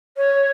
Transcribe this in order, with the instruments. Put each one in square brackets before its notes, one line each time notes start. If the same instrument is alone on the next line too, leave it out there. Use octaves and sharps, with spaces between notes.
[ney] C#5